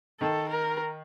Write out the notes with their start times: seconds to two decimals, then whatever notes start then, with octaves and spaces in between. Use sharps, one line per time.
0.21 D#3 A4
0.49 A#4